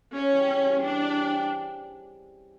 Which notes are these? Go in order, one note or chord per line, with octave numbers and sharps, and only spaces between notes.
C#3 C#4
E3 G3
C#3
E3 G3
G3 D4
C4 E4 G#4
G3